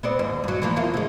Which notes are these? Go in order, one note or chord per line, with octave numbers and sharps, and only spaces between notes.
B3 C4 D5
D#2 G#2
G2 F#3
E3 F3 A#3
E2 A#3 F4
D3 G#3